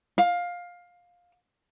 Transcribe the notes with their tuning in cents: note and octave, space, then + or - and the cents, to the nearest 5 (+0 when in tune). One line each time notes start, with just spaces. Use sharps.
F5 +15